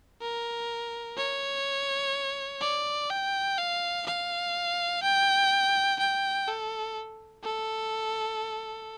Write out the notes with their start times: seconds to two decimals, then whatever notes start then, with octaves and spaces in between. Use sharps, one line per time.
0.21 A#4
1.17 C#5
2.61 D5
3.10 G5
3.58 F5
4.06 F5
5.03 G5
5.99 G5
6.48 A4
7.43 A4